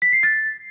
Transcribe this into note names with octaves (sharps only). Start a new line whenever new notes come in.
B6
C7
A6